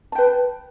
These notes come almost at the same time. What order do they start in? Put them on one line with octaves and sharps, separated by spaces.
A5 G5 B4